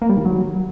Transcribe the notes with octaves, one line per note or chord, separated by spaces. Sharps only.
A#3
G3
D#3
F#3